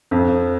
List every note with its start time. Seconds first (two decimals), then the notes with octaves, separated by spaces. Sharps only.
0.11 F2